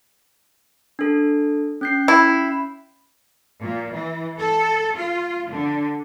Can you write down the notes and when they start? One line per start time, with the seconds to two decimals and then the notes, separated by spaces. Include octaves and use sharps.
0.99 D4 A4
1.81 C#4 G6 C7
2.08 E4
3.60 A#2
3.92 E3
4.37 A4
4.95 F4
5.48 D3